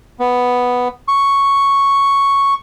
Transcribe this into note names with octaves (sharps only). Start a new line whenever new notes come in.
B3
C#6